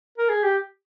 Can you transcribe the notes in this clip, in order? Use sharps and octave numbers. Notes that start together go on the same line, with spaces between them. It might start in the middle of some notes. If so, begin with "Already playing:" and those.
A#4
G#4
G4